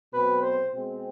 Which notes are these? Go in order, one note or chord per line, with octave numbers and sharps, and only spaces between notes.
B2 F#3 A3 C4 B4
C5
B2 G#3 C4